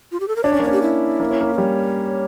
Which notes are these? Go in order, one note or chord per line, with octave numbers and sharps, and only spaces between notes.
F4
G4
A4
A#4
D4 C#5
C#4 D5
A#3
C#4 C#5
G4
E4
A#3
C#4
A#3
A#4
G3 C#5